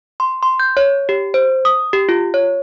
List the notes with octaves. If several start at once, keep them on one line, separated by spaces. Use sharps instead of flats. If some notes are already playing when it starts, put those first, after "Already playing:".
C6
C6
G6
C#5
G4
C5
D#6
G4
F4
C#5